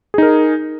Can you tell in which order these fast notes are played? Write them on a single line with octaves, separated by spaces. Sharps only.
G#4 D#4 A#4